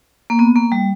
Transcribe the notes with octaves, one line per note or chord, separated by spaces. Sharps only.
A#3
B3
A#3
G3